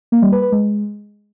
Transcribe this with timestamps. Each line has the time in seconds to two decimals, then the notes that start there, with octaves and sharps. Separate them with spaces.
0.12 A#3
0.22 G3
0.32 B4
0.42 B4
0.52 G#3